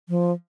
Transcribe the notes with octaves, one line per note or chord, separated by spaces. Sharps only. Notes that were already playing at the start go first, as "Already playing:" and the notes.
F3